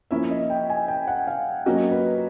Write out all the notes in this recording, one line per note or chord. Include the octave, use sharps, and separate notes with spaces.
F3 A#3 C#4 E4 E5
D#5
G5
G#5
G5
F#5
F5
F#3 A#3 C#4 F#4 D#5
B4